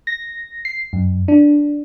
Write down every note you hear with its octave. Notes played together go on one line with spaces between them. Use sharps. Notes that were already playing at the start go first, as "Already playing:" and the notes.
A#6
C7
F#2
D4